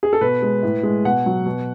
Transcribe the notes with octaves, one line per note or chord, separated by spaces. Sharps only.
G#4
A4
B2 B4
G#3
A2
G#3
B2 F#5
F#3
B2